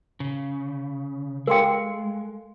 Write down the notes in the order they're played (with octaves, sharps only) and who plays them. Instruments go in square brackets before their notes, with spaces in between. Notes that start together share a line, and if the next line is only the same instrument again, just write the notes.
[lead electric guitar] C#3
[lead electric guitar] G#3 [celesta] A4 F5 C6 [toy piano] A#4 G5